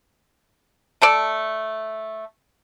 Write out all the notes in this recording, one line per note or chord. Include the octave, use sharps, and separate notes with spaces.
A3 A4 D5